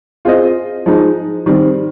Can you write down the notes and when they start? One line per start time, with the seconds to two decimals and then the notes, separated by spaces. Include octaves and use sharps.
0.25 C4 F4 G#4 C5 D#5
0.86 F3 G#3 D#4
1.46 D#3 G3 C4